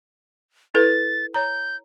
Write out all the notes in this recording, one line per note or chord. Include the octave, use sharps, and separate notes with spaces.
E4 A4 B4 A6
C#5 A#5 G6